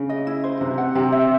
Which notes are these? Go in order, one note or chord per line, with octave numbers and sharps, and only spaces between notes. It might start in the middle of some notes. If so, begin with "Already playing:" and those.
Already playing: C#3
D#5
E4
C5
C3 B4
F#5
C3 G4
E5